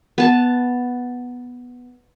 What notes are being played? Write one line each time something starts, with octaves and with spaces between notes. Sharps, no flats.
B3 A5